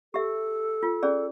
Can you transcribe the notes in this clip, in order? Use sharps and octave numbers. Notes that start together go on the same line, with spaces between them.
G4 A4 E5
F4
C#4 G#4 D5